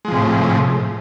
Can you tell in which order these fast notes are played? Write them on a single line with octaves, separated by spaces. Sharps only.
G#3 F3 C3 A2